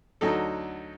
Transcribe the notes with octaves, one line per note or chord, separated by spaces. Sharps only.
D2 F#3 D#4 A4